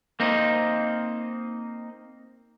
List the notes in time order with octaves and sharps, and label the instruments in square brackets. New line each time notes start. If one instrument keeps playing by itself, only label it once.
[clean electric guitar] A#3 C4 D#4